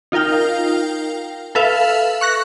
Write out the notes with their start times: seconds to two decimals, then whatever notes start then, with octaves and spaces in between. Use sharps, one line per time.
0.12 D#4 F4 A#4 F5 G5
1.55 A4 B4 E5 F5
2.21 C#6 F#6 A#6